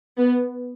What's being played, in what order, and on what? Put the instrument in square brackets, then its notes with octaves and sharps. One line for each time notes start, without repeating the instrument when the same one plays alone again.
[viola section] B3